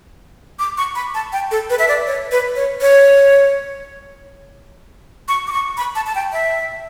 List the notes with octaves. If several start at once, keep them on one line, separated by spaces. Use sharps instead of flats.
D6
C#6
B5
A5
G5
A4
B4
E5
D5
C#5
B4
C#5
C#5
C#6
D6
C#6
B5
A5
A5
G5
E5